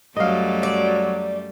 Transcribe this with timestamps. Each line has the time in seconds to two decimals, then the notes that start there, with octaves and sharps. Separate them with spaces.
0.16 F#2 F#3 G3 A3 D#5 F5
0.63 D5